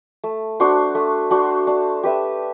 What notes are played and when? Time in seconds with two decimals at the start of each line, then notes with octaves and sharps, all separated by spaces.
0.24 A3
0.60 D4 F#4 C5
0.95 A3
1.31 D4 F#4 C5
1.67 D4
2.03 G4 B4 E5